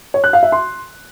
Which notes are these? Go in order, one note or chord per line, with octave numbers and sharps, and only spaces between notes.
C#5
F#6
F5
E5
C6